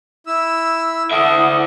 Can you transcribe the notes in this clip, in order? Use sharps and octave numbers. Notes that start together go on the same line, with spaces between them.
E4 E6
E4 A4 D5 E5 F#5 D#6